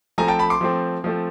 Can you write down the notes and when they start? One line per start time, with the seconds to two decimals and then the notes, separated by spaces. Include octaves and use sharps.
0.18 F3 A3 C4 G#5 A#5
0.28 G5 A5
0.39 A5 B5
0.50 C6 D6
0.61 F3 A3 C4
1.04 F3 A3 C4